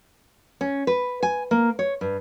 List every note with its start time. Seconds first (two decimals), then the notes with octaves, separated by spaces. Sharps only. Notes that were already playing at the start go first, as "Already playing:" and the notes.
0.61 C#4
0.87 B4
1.23 G#5
1.51 A#3
1.79 C#5
2.01 G2